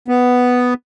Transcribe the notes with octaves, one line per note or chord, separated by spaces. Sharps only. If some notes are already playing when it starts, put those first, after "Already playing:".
B3